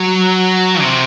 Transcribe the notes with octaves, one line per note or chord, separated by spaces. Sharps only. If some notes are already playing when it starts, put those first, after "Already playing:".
Already playing: F#3
C3